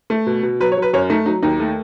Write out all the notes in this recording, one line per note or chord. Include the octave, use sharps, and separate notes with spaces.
A3
B2
B2
F#3 B4
C#5
F#3
B4
F#2 C#5
A3 D#4
F#3 D#4
D#2 D#4
A3